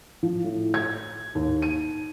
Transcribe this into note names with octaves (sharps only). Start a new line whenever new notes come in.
F3
A2
G#6
D#2
D#7